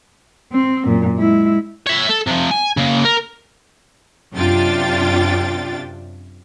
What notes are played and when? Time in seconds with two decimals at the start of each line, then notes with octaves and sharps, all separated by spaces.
0.52 C4
0.85 F#2 A#2
1.18 G#3 E4
1.87 C#5 E5
2.09 A4
2.27 C3 F3
2.51 G#5
2.77 C#3 A#3
3.05 A#4
4.34 F#2 C3 D4 F4 G5 A6